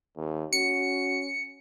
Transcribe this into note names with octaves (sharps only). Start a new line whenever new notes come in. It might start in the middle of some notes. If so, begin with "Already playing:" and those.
D#2
C#4 F#4 C#7